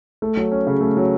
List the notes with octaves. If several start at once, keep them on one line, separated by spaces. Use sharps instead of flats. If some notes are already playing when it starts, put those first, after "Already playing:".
A3
F#3
C#4
C#3
A3
F#3